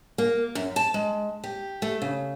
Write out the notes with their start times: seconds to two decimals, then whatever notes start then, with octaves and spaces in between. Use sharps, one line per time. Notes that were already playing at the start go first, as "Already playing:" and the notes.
0.18 A#3
0.55 F#2
0.76 A5
0.94 G#3
1.44 G4
1.82 A3
2.02 C#3